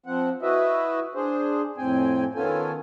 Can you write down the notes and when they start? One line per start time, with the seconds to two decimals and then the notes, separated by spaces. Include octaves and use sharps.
0.06 F3 C4 F#5
0.42 E4 F#4 B4 D#5 E5
1.15 D4 G#4 C5
1.78 F2 A2 C4 G5 G#5
2.35 D#3 B3 C#4 F4 A4 G#5